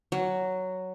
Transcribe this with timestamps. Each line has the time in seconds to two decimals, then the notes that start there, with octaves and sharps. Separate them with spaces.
0.12 F#3